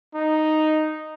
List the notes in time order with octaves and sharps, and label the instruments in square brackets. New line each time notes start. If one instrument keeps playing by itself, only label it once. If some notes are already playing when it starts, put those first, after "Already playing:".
[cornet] D#4